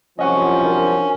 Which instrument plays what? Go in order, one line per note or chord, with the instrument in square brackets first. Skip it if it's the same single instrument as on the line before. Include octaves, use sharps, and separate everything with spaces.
[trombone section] C2 F#2 F3 [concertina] C#4 [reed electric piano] D#5 F#5 C#6
[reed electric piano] D4 F#4 A#4